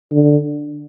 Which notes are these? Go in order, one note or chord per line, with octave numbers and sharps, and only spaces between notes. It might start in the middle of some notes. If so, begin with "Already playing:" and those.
D3